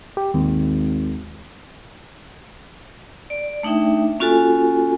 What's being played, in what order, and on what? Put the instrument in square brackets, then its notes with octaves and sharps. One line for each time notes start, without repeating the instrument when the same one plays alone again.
[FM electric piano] G4
[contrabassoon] G#1 [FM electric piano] D#2
[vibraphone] D5
A3 D4 D#4 E5 G5
A#3 C#4 F4 F#4 A4 G#5